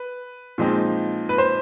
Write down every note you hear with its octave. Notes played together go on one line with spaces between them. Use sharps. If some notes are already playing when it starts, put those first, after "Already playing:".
Already playing: B4
A#2 F3 G#3 C4 D#4
B4
C5